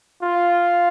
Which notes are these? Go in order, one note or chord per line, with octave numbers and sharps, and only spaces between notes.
F4